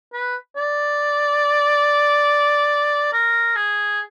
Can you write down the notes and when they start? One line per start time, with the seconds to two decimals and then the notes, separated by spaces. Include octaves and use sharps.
0.13 B4
0.56 D5
3.13 A#4
3.56 G#4